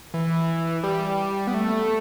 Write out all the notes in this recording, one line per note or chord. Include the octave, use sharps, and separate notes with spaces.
E3
G3
B3
A3